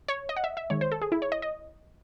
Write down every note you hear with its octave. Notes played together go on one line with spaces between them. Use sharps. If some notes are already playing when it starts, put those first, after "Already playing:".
C#5
D#5
F#5
E5
E5
D#3 G#3 C#5
C5
A4
G#4
E4
C#5
D#5
D#5